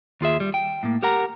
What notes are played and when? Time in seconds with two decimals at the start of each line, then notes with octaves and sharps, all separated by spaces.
0.21 D#2 F4 G#4 E5
0.40 G3
0.54 G5
0.83 A2 A#3
1.03 G4 A#4 F#5 A#5